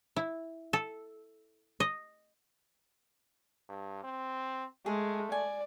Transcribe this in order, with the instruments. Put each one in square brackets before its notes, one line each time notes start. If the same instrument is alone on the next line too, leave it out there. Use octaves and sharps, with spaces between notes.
[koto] E4
A4
D#5
[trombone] G2
C4
[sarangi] G#3 [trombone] A3 [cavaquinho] G#4
[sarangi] D5 [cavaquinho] G#5